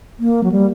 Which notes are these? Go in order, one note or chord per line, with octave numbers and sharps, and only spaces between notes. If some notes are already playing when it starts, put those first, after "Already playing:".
A#3
F#3
G3